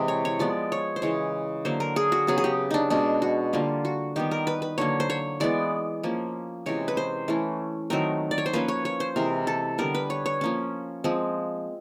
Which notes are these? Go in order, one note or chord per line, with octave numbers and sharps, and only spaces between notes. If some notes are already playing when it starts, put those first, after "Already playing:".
Already playing: C3 E3 G#3
C#5
C#5
F3 G#3 B3 D5
C#5
C5
C#3 E3 G#3 C#5
D3 F#3 A#3 C5
A#4
G#4
F#4
C#3 F#3 B3 G#4
G#4
G4
D4 D#4
B2 G#3 C#4 D4
F#4
D3 G3 A#3 F4
F#4
D#3 G3 B3 G4
A#4
B4
B4
D3 F#3 A#3 C#5
C5
C#5
E3 G#3 B3 D5
F3 A#3 C#4
C3 E3 G#3 C#4 C#5
B4
C5
E3 A3 C#4
D#3 F#3 A3 C4 A#4
D5
C#5
C5
F3 A#3 C#4 B4
C#5
C#5
C5
C3 E3 G#3 A#4
A4
D3 G3 B3 A#4
B4
C#5
C#5
F3 A#3 C#4
F3 G#3 C4